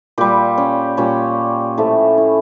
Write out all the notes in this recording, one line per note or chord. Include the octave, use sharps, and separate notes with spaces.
A#2 G3 G4
C#4
A#2 G3 C#4
A2 F3 A3
E4